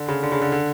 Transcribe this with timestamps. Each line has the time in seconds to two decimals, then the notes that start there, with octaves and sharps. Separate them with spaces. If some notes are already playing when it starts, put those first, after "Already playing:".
Already playing: D3
0.08 C#3
0.23 D3
0.32 C#3
0.42 D3
0.52 D3